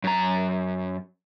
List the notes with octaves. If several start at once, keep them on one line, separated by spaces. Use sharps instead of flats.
F#2 A#5